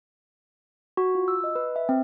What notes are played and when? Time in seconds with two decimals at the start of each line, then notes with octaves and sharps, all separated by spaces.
0.97 F#4
1.15 F4
1.28 E6
1.44 D#5
1.55 B4
1.76 E5
1.89 C4